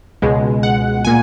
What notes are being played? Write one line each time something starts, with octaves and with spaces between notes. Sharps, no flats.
C#2 B2 G#3
F#5
A#2 G#5